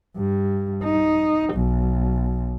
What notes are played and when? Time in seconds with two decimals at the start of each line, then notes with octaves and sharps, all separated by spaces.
0.17 G2
0.84 D#4
1.55 B1